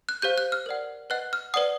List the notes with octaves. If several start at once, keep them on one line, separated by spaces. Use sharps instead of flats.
F#6
G4 C5 F5 G6
F#6
F6
A#4 D5 F#5
B4 D#5 F#5 F#6
F6
B4 D5 F#5 D#6